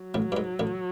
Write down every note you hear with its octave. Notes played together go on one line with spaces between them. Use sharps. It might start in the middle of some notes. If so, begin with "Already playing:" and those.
Already playing: F#3
A1 A2
G2
G#2
A1 A2